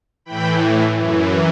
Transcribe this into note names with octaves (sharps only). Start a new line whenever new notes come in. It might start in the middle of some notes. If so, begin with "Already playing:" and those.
A2 E3 G5 B5
F#2 E3